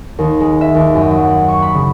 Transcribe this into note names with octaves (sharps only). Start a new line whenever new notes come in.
D#2
G#3
E5
D#2
F#2
F#3
F#5
C#6
B5
C#3